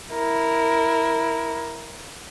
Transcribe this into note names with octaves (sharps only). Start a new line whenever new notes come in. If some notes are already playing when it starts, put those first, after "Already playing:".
E4 A#4